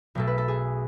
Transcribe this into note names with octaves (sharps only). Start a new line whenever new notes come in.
B1 B2 A3 A4
B4
A4
G#4